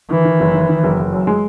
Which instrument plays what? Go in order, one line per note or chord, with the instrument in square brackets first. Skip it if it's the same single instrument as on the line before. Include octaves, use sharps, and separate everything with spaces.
[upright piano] D#3 [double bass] E3
[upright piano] D#3
F#1
D#3
D#3
F#1
F#1
F#2
G#3